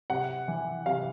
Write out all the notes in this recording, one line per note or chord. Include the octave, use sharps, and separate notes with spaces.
C3 F#5
E3
C3 F5